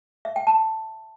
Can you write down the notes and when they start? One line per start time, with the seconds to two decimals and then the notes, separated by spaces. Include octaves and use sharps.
0.25 E5
0.36 G5
0.47 A5